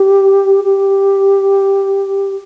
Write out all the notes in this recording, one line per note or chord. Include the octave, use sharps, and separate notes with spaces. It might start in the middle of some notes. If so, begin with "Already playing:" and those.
Already playing: G4
G4